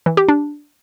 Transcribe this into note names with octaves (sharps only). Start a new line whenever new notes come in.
E3
G4
D4